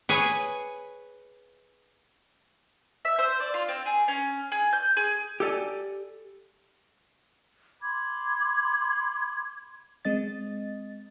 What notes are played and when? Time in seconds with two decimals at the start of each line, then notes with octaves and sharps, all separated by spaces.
0.09 G#4 B4 C#5 G#5
3.05 E5
3.18 C5
3.40 D5
3.54 F4
3.68 C4
3.86 G#4
4.08 C#4
4.52 G#4
4.73 G6
4.97 G#4
5.40 G4 A4 D5 G#5
7.82 B5 C6 D6 G#6
10.05 G#3 C4 D#5 A6